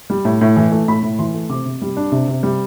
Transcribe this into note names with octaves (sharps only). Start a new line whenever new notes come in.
G3
A2
A2
E3
A3
A2 B5
A2
E3 C6
A3
C3 D6
C3
G3
D4
C3
C3
G3